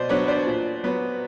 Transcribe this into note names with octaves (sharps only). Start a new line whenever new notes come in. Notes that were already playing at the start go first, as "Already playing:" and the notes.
Already playing: B2 C5 D5 D#5
F#3 B3 D4 B4 C#5
C5 D5
A#2
F#3 B3